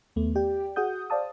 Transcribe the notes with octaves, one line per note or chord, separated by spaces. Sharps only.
D#2 A3 B3
G4 D5 G5
F#4 G#4 F#5 D#6 G6
C5 D5 F5 A5 D#6